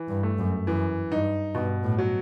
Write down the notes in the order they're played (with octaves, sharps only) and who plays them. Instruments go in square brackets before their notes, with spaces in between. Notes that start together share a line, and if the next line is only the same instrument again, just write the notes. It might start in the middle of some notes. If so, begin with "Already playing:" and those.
Already playing: [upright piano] E3
[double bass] G2
[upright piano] A3
[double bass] F#2
[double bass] F#2 [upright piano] E3
[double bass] G2 [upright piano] D#4
[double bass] G2 [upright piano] B2
[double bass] A2
[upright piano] F#3